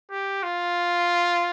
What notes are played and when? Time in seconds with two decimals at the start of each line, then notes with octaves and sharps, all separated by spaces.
0.11 G4
0.43 F4